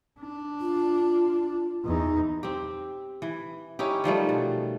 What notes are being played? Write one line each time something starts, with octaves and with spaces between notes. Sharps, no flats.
D4
F4
E2 D#4
C4 G4
E3
C#4 D#4 E4 G4
D#3 F3 G3 A3
B2